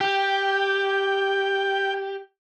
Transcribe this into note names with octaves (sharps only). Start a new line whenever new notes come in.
G4 G5